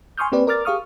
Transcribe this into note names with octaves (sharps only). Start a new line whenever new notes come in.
G#5 C6 C#6 D#6 F6 G6
A#3 C4 G4 B4 D5
A#4 D5 D6 F6 A6
G4 G#4 F5 C#6 D#6 F6